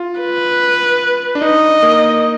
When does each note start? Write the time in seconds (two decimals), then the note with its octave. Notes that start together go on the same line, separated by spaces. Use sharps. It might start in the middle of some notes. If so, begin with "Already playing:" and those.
Already playing: F4
0.20 B4
1.35 D4
1.42 D#4 D#5
1.83 A#3